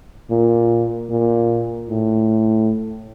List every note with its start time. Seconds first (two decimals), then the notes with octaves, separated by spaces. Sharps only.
0.30 A#2
1.10 A#2
1.89 A2